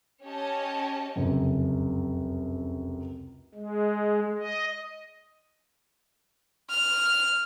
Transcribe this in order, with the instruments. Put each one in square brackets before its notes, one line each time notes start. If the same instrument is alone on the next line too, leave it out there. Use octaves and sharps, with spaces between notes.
[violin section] C#4 G4 C#5 D#5 A5
[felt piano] F1 C#2 F#2
[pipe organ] G#3
D#5
[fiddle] F6